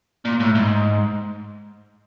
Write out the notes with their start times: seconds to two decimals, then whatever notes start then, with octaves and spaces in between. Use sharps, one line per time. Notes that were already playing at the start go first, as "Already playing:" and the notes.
0.25 A#2
0.40 A2
0.55 G#2